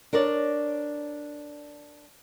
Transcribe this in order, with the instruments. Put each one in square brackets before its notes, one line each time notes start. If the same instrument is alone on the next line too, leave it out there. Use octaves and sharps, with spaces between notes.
[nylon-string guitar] D4 A#4 C#5 D5